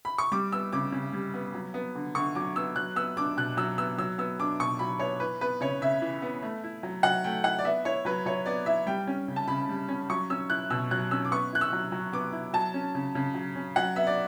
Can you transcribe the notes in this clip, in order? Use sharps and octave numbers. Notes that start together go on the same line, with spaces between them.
B5
C#6
G3 D6
B3 E6
C#3 D6
C#3
G3
B3
F#3
B3
D3
D3 C#6
F#3 D6
B3 E6
F#3 F#6
B3 E6
D4 D6
B2 F#6
F#3 E6
B3 E6
F#3 E6
B3 E6
D4 D6
B2 C#6
F#3 B5
B3 C#5
E3 B4
B3 B4
C#3 C#5
C#3 E5
E3
B3
A3
E4
F#3
F#3 F#5
A3 G5
E4 F#5
D5
B3 E5
E4 C#5
F#3 B4
F#3 C#5
B3 D5
E4 E5
G3 G5
C#4
C#3
A5
C#3 B5
G3
C#4
F#3 C#6
C#4 E6
E4 F#6
B2 E6
F#3 F#6
C#4 E6
D6
B3 C#6
E4 F#6
E6
F#3
F#3
B3 D6
E4
F#3 A5
C#4
C#3
C#3
F#3
C#4
F#3 F#5
B3 E5
D5